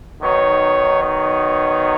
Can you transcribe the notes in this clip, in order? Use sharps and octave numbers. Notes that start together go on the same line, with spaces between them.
D#3 F#3 B3 D#4 C#5
C#5